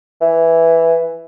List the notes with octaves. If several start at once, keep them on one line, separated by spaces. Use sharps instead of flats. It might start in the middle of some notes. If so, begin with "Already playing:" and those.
E3